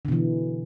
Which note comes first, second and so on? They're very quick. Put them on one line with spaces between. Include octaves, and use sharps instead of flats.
D3 B2 E3